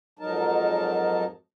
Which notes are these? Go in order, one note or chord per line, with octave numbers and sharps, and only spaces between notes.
F2 G#2 F#3 D#4 A#4 A5